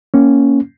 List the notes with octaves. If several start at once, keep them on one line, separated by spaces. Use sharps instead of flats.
A#3 C#4